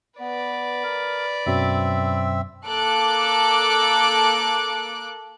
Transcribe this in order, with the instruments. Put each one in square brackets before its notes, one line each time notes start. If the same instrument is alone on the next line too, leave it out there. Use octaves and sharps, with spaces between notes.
[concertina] B3 [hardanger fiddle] B4 D5
[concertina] A#4
[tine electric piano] F#2 B2 F#3 [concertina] C4 E5
[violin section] A#3 A4 D6 F#6 D7